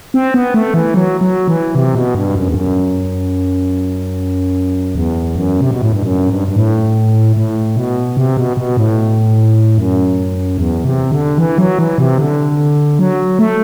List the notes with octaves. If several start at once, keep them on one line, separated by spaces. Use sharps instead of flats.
C4
B3
A3
E3
F#3
F#3
E3
C3
B2
G2
F#2
E2
F#2
E2
F#2
C3
B2
A2
G2
F#2
G2
G2
A2
A2
B2
C3
B2
B2
A2
F#2
E2
C3
D3
E3
F#3
E3
C3
D3
F#3
A3